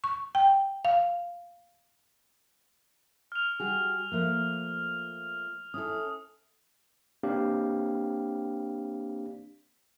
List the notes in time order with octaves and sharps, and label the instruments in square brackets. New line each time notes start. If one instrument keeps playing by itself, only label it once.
[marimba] C#6
G5
F5
[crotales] F6 F7
[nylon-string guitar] G3 F#4 G#4
F3 A3 A#3
[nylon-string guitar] C#4 E4 A4 [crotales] D#6
[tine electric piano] A#3 C4 D4 G4 F5